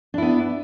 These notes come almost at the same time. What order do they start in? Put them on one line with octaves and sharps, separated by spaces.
D4 E4 B3